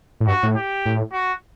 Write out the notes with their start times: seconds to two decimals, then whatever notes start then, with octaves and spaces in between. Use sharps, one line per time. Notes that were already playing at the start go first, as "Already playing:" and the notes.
0.20 A2
0.27 G2 F#4
0.43 A2
0.56 G4
0.85 A2
1.13 F#4